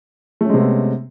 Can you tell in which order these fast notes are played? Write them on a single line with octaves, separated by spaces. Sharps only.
A3 C#4 G#3 C3 B3